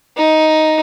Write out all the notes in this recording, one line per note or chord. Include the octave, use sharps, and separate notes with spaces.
D#4